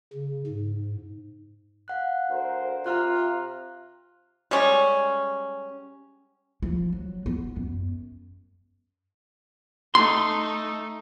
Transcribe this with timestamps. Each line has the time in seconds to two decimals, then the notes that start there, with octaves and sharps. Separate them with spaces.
0.13 C#3
0.47 G#2
1.88 F5 F#5 F#6
2.31 D2 A#4 C5
2.86 C3 F4 A#5 F6 F#6
4.51 G3 G#3 C#4
6.62 F3
6.93 F#3
7.26 B3
7.56 F#2
9.95 A3 D#4 C6